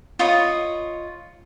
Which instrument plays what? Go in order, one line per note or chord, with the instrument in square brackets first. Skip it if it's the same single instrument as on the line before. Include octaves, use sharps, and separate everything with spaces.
[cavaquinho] F4 C#5 D#5 B5